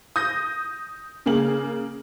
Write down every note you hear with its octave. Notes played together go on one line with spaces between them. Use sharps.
D#6 G6 A#6
C#3 A#3 G#4 F#7